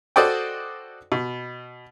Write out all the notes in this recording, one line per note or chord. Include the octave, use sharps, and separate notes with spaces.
F#4 A4 C5 D5 D#5 G5
B2